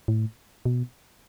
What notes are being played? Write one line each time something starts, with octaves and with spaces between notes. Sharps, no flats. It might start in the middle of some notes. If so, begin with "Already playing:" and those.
A2
B2